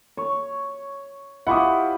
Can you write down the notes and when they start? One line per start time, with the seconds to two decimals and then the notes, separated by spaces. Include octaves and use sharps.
0.17 C#5
1.47 E4 F4 G4 F#5 C#6 D#6